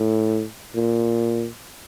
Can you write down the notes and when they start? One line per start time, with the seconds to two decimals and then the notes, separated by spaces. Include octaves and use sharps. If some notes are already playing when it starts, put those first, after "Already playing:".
Already playing: A2
0.75 A#2